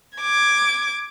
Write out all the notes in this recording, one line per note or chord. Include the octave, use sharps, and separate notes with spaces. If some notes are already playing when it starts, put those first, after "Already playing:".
D6 G#6